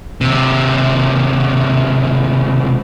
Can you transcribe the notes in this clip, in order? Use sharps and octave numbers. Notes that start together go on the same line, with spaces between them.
D#2 C3